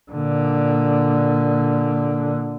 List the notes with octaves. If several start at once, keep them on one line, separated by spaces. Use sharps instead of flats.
A#2 D3